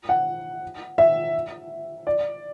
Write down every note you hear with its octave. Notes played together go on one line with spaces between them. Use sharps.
F#5
E5
D5